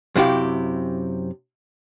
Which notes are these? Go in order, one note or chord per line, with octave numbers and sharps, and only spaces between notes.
F#2 C3 E4 G4 F5